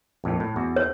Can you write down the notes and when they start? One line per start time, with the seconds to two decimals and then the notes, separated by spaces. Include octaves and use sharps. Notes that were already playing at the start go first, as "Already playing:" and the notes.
0.24 A#1 F2 A2
0.40 A2
0.56 E2 F#4
0.76 C#5